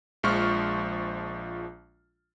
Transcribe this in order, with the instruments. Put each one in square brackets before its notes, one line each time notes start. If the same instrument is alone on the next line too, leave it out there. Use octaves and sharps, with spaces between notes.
[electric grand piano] A#1 F3 G#3 F4 C#6 F6